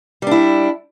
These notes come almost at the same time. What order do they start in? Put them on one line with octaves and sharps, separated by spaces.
G3 D4 E4